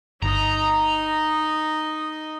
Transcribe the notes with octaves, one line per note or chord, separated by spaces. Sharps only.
G1 D#4 D#5 A#5